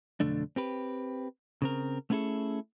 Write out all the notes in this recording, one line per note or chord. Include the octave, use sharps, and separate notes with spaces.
B1 F2 D3 A3 D4
C4 G4 B4
C#3 C4 A#4
A3 B3 C#4 E4 G#4 A4